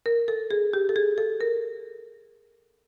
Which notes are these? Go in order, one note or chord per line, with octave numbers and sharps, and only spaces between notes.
A#4
A4
G#4
G4
A4
G#4
A4
A#4